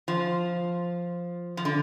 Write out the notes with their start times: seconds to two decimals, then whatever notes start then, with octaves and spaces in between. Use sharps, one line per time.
0.08 F3
1.57 F3
1.65 D3